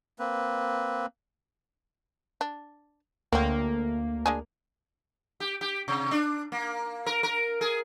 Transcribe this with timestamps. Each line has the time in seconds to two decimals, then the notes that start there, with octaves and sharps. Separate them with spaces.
0.19 A#3 C4 B4
2.41 D4
3.33 D2 F#3 A#3 C4
4.26 G#3 D4 G#4
5.40 G4
5.61 G4
5.88 C3
6.11 D4
6.52 A#3
7.06 A#4
7.23 A#4
7.61 G#4